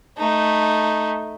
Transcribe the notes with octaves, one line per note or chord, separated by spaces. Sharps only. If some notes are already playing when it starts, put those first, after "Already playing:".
A3 D#4